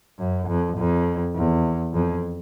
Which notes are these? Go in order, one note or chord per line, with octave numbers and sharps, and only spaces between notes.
F#2
F2
F2
E2
F2